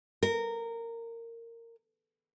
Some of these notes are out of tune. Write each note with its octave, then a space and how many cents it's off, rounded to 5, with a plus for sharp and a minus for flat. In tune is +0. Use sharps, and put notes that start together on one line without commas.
A#4 -15